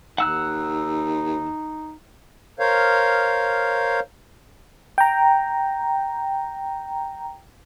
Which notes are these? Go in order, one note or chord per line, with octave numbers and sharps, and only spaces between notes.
D#2 D#4 F#5 E6 F#6
A#4 C5 C#5 F5
G5 A#5